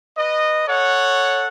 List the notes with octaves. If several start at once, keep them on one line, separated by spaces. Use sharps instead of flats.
B4 D#5
A4 C#5 F#5